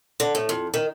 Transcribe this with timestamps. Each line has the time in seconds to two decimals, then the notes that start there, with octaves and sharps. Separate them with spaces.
0.20 D3
0.35 A2
0.49 F2
0.74 D#3